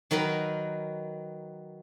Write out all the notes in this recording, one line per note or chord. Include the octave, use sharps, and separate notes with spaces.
D#3 F#3 A#4 B4